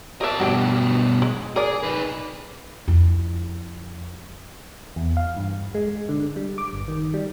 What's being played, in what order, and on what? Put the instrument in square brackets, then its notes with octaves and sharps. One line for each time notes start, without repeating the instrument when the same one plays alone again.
[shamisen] G4 A#4 E5 [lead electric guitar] D#5 A5
[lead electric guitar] G2 B2 [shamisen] F#4 G4 G5
[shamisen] G#3
[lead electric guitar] G#4 [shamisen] A#4 D5
[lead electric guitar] D#4 B4
[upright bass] F2 E4
[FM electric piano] E2
F5
G2
G#3
D3
G3
D6
G1
D#3
G3